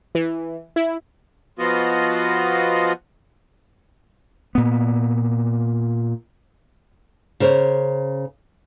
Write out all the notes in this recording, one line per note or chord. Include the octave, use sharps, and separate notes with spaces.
E3
E4
F3 B3 F4 F#4 D#5
A#2 B3
C#3 A#4 C5 C#5